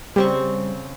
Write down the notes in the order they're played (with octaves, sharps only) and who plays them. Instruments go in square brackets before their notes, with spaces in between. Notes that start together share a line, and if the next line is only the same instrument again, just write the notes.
[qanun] C#3 C4 C#6 [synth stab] G3